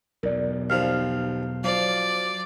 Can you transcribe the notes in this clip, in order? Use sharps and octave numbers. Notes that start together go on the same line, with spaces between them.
B1 E2 A#4 D5
D#2 F3 F6
F3 F#3 D5